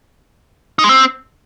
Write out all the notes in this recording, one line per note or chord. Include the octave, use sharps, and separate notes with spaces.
D#4
G#3
C4